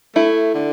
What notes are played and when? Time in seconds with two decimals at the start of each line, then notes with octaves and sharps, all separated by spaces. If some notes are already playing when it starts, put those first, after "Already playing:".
0.15 A3 E4
0.55 D3